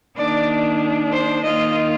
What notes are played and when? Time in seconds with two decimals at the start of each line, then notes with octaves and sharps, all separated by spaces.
0.16 D#3 A#3 D4 D5
1.12 C5
1.44 D#3 A#3 F4 D#5